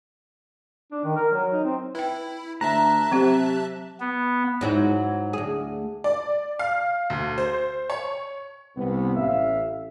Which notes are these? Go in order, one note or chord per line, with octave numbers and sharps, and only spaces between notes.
D4
D#3
A#4
F#3
D#4
C4
E4 B4 G5
D2 E5 A5 A#5 F#6
C3 F#3 C4 G4
B3
G#2 F#3 E4
D2 G#4
D5
F5
D2
C5
C#5
C2 B3
A1 E5 F5